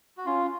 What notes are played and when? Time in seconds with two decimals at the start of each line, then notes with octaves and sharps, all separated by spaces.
0.17 F#4
0.26 C#4 F4